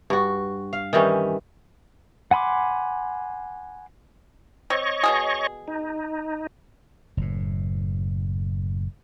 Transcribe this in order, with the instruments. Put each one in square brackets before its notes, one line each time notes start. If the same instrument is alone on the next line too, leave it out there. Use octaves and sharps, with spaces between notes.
[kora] G2 F#4
F5
D#3 E3 G3 C#4
[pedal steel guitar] F#5 G#5 B5 C6 D6
[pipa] C4 [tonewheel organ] C#5 D#5 C#6
[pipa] B2 G3 G#4
[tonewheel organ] D#4
[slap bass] F#1 A2